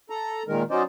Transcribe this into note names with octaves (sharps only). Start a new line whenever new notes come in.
A4 A#5
A#2 D#3 G#3 A#4
F#3 C#4 D#4 C5 D5 D#5